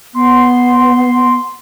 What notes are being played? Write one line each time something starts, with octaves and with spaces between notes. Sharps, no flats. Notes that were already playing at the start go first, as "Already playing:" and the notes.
B3 C6